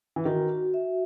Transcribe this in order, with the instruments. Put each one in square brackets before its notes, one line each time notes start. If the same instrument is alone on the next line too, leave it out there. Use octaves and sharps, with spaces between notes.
[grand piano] E3
[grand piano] D#3 [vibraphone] F#4
[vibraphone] F#4
E5